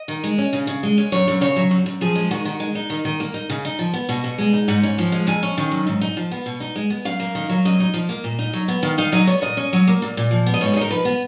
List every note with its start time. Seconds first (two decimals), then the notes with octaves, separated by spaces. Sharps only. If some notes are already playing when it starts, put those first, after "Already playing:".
Already playing: D#5
0.08 D#3
0.24 G#3
0.38 C#4
0.53 C#3
0.67 C#3
0.83 G#3
0.98 C#4
1.12 F#2 C#5
1.28 F#2
1.41 C#3 C#5
1.56 F#3
1.71 F#2
1.86 F#2
2.01 F3 G#4
2.15 G#3
2.31 D#3 F#4
2.45 D#3
2.60 G#3
2.75 D#4
2.90 D#3
3.05 D#3
3.20 A#3
3.34 D#4
3.50 C#3
3.65 D#4
3.79 F3
3.94 B3
4.09 B2 F#4
4.24 B2
4.38 G#3
4.53 D#4
4.68 G#2 F#5
4.83 C#4
4.98 F3
5.12 G#3
5.27 F2 G#5
5.43 C#4
5.58 D#3
5.72 F#3
5.87 G#2
6.01 D#4
6.17 F3
6.32 B3
6.46 B2
6.60 D#4
6.76 G#3
6.90 B3
7.05 F#2 F5
7.20 A#3
7.35 D#3
7.50 F#3
7.65 F#2 D#5
7.80 D#4
7.94 F3
8.09 A#3
8.24 A#2
8.39 D#4
8.53 F#3
8.68 B3
8.83 D#3 F5
8.98 D#4 F5
9.12 F#3 D#5
9.27 B3 C#5
9.42 A#2 D#5
9.57 C#4
9.73 F#3
9.87 A#3
10.02 A#2
10.17 A#2
10.31 F3
10.46 B3
10.54 D#5
10.61 G#2 C#5
10.73 G#4
10.77 D#4 A#4
10.91 F3 B4
11.05 B3